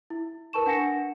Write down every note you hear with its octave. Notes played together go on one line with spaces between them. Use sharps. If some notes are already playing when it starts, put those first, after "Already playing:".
E4
A#4 B4 A5 C#6 E7
D4 F#5 G#5 A#6 C#7